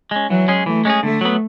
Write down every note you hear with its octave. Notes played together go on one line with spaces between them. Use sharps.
G#3 C#4
E3 F#3
G#3 C#4 G#4
E3 A3
G#3 C#4 G#4
D3 A3
F#3 B3